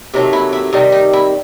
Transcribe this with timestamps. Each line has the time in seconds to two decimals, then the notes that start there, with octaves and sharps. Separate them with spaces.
0.14 C3 D#3 F#3 A3
0.33 E4
0.53 E4
0.73 C3 D#3 G3 D#4
0.92 D#4
1.13 E4